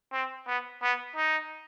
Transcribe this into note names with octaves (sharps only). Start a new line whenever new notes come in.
C4
B3
B3
D#4